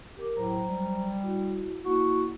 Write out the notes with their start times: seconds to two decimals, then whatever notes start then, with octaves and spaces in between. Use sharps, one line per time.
0.16 G4 A#4 D6
0.36 A2 F#3 C5 A#5
0.68 G3
1.23 E4 F#4
1.84 A#3 E4 F#4